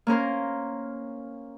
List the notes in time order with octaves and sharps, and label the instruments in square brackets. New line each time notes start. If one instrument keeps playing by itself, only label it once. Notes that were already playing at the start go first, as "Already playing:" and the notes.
[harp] A#3 C#4 A#4 C5